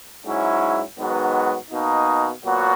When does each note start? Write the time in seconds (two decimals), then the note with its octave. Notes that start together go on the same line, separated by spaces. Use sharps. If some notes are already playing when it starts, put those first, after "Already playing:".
0.24 G#2 F#3 C#4 E4
0.97 G#2 D#3 F#3 B3 F#4
1.71 B2 A#3 D#4
2.45 A#2 F#3 B3 F#4